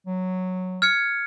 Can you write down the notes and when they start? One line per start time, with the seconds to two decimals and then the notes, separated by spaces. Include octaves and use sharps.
0.07 F#3
0.82 F6 G#6 C#7